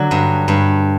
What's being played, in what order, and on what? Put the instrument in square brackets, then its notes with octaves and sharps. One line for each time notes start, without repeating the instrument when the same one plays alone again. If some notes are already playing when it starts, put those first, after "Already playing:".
Already playing: [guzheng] D3 F#3 D5
G2
G2